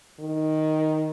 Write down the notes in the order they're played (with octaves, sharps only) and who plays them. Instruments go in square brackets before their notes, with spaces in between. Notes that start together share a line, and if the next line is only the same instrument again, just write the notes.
[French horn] D#3